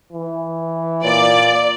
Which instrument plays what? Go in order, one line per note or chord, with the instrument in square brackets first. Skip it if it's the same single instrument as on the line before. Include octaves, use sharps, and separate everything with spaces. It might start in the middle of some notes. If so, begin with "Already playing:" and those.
[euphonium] E3
[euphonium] A#2 [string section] D5